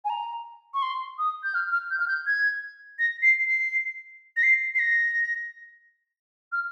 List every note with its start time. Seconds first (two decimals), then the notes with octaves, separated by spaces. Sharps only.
0.05 G#5
0.10 A#5
0.74 C#6
0.82 C6
1.19 D#6
1.44 G6
1.55 F6
1.72 F6
1.91 G6
2.00 F6
2.08 G6
2.27 G#6
2.99 A#6
3.22 C7
3.47 C7
4.37 A#6
4.43 C7
4.75 C7
4.79 A#6
6.52 F6